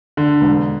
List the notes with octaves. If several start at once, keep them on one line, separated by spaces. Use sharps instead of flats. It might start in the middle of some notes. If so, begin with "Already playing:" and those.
D3
E1